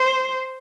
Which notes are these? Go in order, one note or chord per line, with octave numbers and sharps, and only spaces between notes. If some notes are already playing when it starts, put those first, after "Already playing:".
Already playing: C5